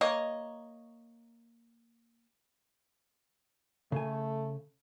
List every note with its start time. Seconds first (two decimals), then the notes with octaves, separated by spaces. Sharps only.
0.01 A#3 C#5 D#5
3.92 C#3 A3 G#5